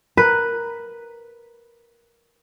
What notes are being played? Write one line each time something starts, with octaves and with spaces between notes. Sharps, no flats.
A#4 B4